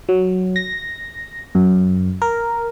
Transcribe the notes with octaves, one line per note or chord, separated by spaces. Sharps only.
F#3
A#6
F#2
A#4